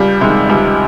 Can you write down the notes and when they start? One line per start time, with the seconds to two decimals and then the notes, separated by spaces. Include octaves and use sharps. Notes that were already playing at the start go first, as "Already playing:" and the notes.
Already playing: C#2 G3
0.21 C3 D#3 G#3
0.49 C#2 G3